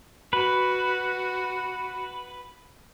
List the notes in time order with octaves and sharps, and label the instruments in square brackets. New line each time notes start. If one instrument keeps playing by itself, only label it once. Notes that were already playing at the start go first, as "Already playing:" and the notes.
[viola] F#4 [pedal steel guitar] B4